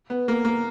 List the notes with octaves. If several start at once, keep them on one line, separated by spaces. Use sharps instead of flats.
B3
A#3
A#3